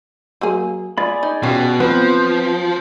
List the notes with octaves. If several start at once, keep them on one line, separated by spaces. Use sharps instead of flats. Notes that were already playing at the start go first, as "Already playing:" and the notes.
F#3 A#3 G#4
F4 G#4 D5 B5
D#4
B2 C#4 F4 G4
F3 B3 C4 B4 B5